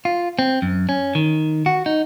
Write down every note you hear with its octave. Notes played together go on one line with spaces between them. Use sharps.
F4
C4
F#2
C#4
D#3
F#4
D#4